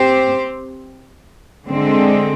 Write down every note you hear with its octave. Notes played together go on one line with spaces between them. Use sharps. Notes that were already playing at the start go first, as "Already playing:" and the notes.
Already playing: C4 G4 C5
D3 G#3 C4